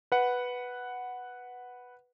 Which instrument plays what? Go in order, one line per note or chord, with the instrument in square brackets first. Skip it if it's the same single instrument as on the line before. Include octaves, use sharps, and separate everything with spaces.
[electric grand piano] B4 F#5